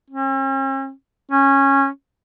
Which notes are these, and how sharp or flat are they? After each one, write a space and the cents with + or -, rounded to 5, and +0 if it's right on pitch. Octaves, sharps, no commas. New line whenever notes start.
C#4 -45
C#4 -15